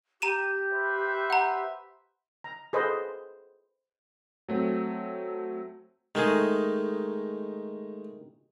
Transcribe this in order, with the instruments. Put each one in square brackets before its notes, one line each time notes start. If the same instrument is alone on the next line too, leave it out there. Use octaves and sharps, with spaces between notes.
[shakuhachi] G4 [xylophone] A#5 D#7 E7
[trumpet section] B4 C5 E5
[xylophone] F#5 A#5
[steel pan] A#5
G#4 A4 B4 C5 D#5
[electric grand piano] F#3 A3 C4
[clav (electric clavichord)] D#3 G#4 [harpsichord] G#3 A3 D#4